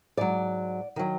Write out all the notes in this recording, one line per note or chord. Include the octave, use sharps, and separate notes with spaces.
G#2 F#3 D5
D#3 F#3